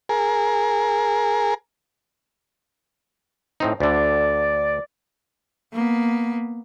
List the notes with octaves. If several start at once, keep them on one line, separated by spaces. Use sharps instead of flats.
G#4 A#4
A2 C4 D#4
D2 D3 D5
A#3 B3